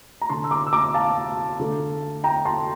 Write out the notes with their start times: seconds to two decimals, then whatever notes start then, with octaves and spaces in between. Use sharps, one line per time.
0.21 A#5
0.29 D3 A3 A5 C6
0.44 E6
0.51 A#5 D6
0.67 E6
0.73 A#5 D6
0.94 F5 A5
1.59 D3 A3
2.24 G5 A#5
2.45 A5 C6